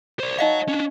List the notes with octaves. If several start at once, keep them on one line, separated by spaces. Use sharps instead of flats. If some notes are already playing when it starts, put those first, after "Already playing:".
C5 D5
D#4 C#5 D#5 F5 F#5
C#4 D4